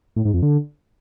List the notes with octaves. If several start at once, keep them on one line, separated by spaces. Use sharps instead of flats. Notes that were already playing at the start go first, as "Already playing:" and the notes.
A2
G#2
F2
D3